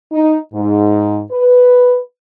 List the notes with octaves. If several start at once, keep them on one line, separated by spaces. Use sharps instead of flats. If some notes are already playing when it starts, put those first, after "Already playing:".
D#4
G#2
B4